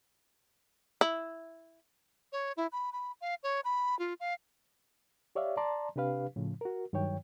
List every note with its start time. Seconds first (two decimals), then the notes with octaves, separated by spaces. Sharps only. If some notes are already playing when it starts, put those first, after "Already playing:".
1.01 E4
2.32 C#5
2.57 E4
2.72 B5
2.93 B5
3.21 F5
3.43 C#5
3.65 B5
3.99 F4
4.20 F5
5.35 G4 C#5 D5 E5 F5
5.57 D5 A5 A#5 C6
5.96 C3 D4 G4 B4 F5
6.36 A2 C#3 F3
6.61 F#4 A#4
6.93 G2 D#3 F#3 C#5 G5